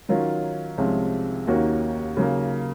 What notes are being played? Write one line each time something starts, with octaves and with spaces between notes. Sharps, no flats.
D#3 F#3 C#4 F4 A#4
C2 C3 F3 G#3 C#4
D#2 D#3 A#3 C#4 F#4
C#3 F#3 A#3